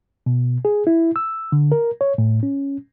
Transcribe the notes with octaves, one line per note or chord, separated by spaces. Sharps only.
B2
G#4
E4
E6
D3
A#4
C#5
A2
C#4